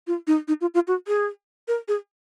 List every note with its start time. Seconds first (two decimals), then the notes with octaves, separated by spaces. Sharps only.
0.07 F4
0.27 D#4
0.48 D#4
0.61 F4
0.74 F4
0.88 F#4
1.08 G#4
1.68 A#4
1.88 G#4